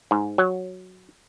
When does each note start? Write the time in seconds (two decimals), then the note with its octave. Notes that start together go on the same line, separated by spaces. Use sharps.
0.11 G#2
0.38 F#3